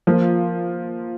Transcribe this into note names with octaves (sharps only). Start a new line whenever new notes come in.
F3 A#3 F4